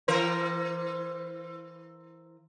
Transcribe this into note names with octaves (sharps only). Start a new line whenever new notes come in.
E3 A#4 C5